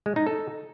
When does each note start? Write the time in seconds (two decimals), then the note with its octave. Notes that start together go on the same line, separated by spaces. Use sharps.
0.06 G#3
0.16 D#4
0.27 A4